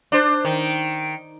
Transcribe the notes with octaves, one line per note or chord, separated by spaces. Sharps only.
D4 C5
D#3